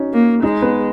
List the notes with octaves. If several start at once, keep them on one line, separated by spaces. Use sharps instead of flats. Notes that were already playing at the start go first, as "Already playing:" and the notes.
Already playing: C#4 D#4 F#4
A#3
G#3 D#4 D#5
B3 B4